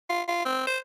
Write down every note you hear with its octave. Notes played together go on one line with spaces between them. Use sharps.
F4
F4
C4
C5